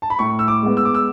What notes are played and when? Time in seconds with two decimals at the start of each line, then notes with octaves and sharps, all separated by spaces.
0.02 A5
0.10 B5
0.19 A2 C#6
0.39 E6
0.48 D6
0.62 G#3 B3
0.77 E6
0.85 D6
0.95 E6